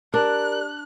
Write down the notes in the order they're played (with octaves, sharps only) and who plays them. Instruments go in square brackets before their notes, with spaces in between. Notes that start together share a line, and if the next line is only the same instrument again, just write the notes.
[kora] D4 [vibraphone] G4 D5 [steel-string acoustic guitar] A#4 [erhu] F#6